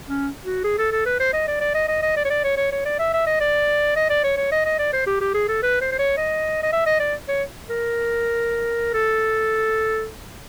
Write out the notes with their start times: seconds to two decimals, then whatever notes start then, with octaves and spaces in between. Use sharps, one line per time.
0.09 C#4
0.45 F#4
0.64 G#4
0.78 A4
0.92 A4
1.06 B4
1.20 C5
1.33 D#5
1.47 D5
1.61 D5
1.75 D#5
1.88 D#5
2.02 D#5
2.16 D5
2.25 C#5
2.30 D5
2.44 C#5
2.57 C#5
2.72 C#5
2.86 D5
2.99 E5
3.13 E5
3.27 D#5
3.40 D5
3.96 D#5
4.10 D5
4.24 C#5
4.37 C#5
4.52 D#5
4.65 D#5
4.79 D5
4.93 C5
5.07 G4
5.21 G4
5.34 G#4
5.48 A4
5.62 B4
5.81 C5
5.92 C5
5.99 C#5
6.17 D#5
6.63 D#5
6.72 E5
6.86 D#5
7.00 D5
7.28 C#5
7.70 A#4
8.94 A4